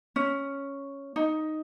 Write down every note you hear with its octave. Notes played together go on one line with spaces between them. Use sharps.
C#4
D#4